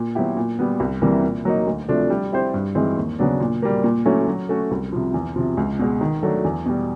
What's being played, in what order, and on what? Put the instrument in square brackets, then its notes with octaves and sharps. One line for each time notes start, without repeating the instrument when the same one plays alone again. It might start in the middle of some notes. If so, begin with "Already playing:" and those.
Already playing: [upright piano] A#2
F#3 B3 E4 G4
A#2
G3 B3
C2
C3 E3 G3 A#3
A#2
F#3 A#3 D#4
D2
C3 F3 A3 D4
G3
C4 E4 G4 C5
G2
E3 G#3 C4 D#4
D#2
C#3 F#3 B3 D4
A#2
G3 A#3
A#2
F#3 A3 C#4 E4
F#3
A3 C#4 F#4
C2
C3 F3
E2
C3 F3
C#2
B2 G#3
D#3
F#3 A3 D4
E2
B2 G3